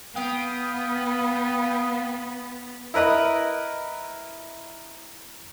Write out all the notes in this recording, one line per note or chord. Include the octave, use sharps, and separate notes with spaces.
B3 F5 G5 D#6
E4 A#4 B4 D#5 E5